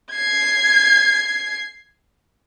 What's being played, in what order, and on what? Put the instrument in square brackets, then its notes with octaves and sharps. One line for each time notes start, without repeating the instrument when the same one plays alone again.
[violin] G#6 C7